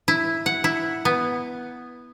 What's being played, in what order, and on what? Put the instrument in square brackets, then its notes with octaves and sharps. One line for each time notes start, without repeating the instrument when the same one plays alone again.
[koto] E4
F#5
E4
B3